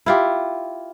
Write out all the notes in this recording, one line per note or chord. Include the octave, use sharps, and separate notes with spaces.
E4 F4 G4